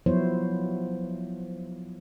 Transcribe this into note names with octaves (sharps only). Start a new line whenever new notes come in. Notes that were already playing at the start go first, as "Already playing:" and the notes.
F3 F#3 B3 E4 C5 C#5